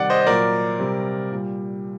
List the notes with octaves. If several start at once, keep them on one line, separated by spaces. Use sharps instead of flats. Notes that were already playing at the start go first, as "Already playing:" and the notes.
Already playing: C3 D#3 G3 D5 F#5
C5 D#5
D#5
A#2 F#3 A#4 D5
C3 G3
A#2 G3